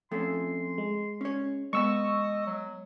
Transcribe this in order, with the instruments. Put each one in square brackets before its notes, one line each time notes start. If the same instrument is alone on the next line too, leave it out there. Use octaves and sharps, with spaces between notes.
[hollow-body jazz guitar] F2 A3 C#4 [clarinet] C6
[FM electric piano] G#3
[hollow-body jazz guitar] C#4 C#5
[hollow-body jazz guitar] G#3 B3 [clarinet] D#5 [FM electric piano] C#6 E6
[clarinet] F#3